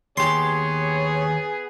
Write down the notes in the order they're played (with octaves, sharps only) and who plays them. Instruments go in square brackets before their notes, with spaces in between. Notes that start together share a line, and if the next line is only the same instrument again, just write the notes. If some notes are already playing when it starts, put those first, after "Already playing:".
[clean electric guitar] D#2 G4 [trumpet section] B3 G#4 [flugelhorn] C#5 [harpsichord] C6